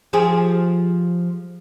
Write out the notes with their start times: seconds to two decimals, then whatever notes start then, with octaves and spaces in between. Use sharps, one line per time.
0.13 F3 G4 G#4